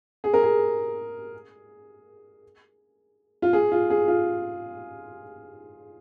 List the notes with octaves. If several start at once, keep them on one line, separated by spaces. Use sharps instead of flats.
G#4
A#4
G#4
F4
G#4
F4
G#4
F4